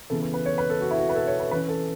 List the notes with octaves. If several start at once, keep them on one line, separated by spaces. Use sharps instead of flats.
C#3 E3 B3 A4
B4
B4
C#5
B4
A4
F#4
E4
F#4
B4
A4
C#5
B4
E3 C#4 B4
A4